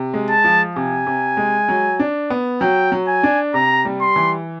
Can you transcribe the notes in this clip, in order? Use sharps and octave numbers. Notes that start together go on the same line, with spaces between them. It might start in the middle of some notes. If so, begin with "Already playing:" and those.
Already playing: C3
G#3
A5
F3
C3 G#5
C3
G#3
F#3
D4
B3
F#3 G5
F#3
G#5
D4
C3 A#5
G3
C6
E3